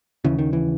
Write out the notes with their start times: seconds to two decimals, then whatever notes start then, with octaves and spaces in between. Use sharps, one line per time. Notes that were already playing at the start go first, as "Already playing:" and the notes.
0.25 D#2 C#3 E3
0.39 D#3
0.53 E3